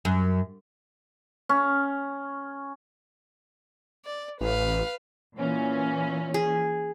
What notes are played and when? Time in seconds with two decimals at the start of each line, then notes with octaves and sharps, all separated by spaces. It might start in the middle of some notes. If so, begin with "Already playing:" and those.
0.05 F#2
1.49 C#4
4.05 D5
4.41 A1 B4 F5
5.36 A#2 E3 C#4
6.34 G#4